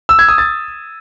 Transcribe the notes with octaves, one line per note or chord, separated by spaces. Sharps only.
E6
G#6
D#6
A6